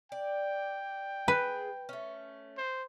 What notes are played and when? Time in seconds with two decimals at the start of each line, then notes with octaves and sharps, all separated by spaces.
0.12 D5 G5
1.28 G#4 B4
1.89 A3 C#4
2.58 C5